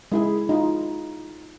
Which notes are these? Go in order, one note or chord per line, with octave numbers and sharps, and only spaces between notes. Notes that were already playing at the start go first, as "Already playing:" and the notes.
G#3 E4 G#4
D#4 F4